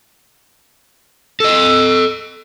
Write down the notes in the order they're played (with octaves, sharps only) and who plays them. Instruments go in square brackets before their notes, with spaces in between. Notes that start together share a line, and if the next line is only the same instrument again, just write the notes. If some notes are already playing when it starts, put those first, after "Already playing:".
[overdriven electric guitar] A4 D#5 [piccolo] E6